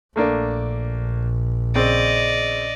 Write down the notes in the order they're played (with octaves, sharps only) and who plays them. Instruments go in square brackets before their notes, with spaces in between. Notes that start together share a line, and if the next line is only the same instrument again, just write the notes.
[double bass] A#1 [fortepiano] A3 A#3 D4
[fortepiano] C#3 C4 [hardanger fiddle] D5 D#5